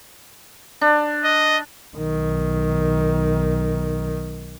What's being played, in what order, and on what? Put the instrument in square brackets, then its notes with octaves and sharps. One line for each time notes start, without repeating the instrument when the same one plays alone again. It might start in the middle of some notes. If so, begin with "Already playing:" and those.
[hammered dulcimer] D4
[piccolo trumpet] D#5
[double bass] B1 D#3